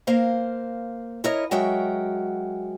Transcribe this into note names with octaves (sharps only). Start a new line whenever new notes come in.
A#3 A#4 C5 F5
E4 A#4 C#5 D#5
F#3 G#3 F#4 A#4 E5 G5